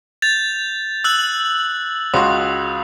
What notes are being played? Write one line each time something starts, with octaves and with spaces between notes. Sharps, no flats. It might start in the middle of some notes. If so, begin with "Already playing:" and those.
G6 A6 F7
E6 F#6 F#7
C#2 F#4 C6 D#6